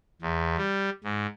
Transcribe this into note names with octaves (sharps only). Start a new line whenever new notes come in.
E2
G3
G#2